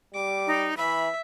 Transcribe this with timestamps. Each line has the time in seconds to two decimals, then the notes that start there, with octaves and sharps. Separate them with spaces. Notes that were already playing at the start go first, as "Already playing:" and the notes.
0.14 G3 D6
0.47 D#4
0.77 E3 E5 B5